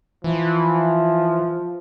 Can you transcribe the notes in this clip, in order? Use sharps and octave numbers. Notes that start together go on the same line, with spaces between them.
E3 F3